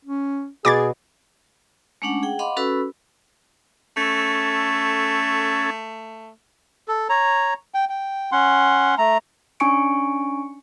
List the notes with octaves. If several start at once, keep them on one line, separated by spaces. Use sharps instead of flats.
C#4
B2 G#4 D6 G#6 A6
G#3 A3 C#4 D4 F#5
G#4 F#5 G5
D#5 F5 F#5 B5 C6 D6
C#4 F#4 A4 B4 B5 E6
A3 C#4 A4
A4
C#5 A#5
G5
G5
C#4 F#5 C6
A3 A#5
C#4 D4 G#5 C#6 C#7 D7